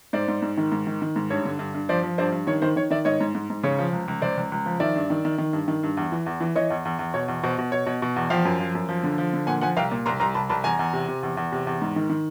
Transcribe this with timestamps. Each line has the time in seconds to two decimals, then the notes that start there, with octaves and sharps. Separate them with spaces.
0.13 G#2 C5 D5
0.28 G#2
0.42 G#2
0.57 D#3
0.72 G#2
0.87 D#3
1.02 D#3
1.16 G#2
1.30 G2 C#5
1.45 D3
1.59 G2
1.74 G2
1.89 F3 C5 D5
2.03 F3
2.18 G2 C5 D5
2.32 G2
2.47 D#3 C#5
2.62 D#3 C5
2.76 D#3 C#5
2.90 D#3 D5 E5
3.05 G#2 C#5 D#5
3.20 G#2
3.35 G#2
3.50 G#2
3.64 C#3 C#5
3.79 F3
3.93 C#2
4.08 C#2
4.22 C#2 C5 D5
4.37 C#2
4.52 C#2
4.66 F3
4.80 D#3 D5 E5
4.95 G2
5.10 D#3
5.25 D#3
5.38 D#3
5.53 G2
5.68 D#3
5.83 G2
5.97 E2
6.12 E3
6.26 E2
6.40 E3
6.56 E3 C#5 D#5
6.70 E2
6.85 E2
6.99 E2
7.14 B2 C#5
7.28 E2
7.43 B2 C5
7.58 B2
7.72 B2 C#5
7.86 B2
8.02 B2
8.16 E2
8.30 F3 F5 G5
8.45 F#2
8.60 F3
8.75 F#2
8.89 F3
9.03 D3
9.18 F3
9.34 D3
9.47 A#2 F#5 G#5
9.61 F3 F#5 G#5
9.77 C2 F5 G5
9.91 A#2
10.06 C2 A#5 C6
10.20 C2 A#5 C6
10.34 C2 A5 B5
10.49 C2 A5 B5
10.64 E2 G#5 A#5
10.79 E2
10.93 C3
11.08 C3
11.23 E2
11.37 E2
11.52 C3
11.67 E2
11.82 G#2
11.96 D#3
12.10 D#3